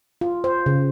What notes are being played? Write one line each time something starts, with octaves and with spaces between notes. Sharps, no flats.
F4
C5
C#3